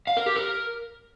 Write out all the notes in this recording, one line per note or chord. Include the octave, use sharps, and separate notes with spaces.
F5
A#4
G4
A#4